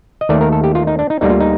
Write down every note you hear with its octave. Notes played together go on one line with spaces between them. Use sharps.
D#5
D#2 D#3 A3 D5
A#4
A4
G4
F4
D#4
D4
D#4
D2 D3 G3 A#3 D#4
F4
D#4